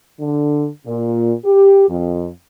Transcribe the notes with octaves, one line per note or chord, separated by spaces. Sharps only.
D3
A#2
G4
F2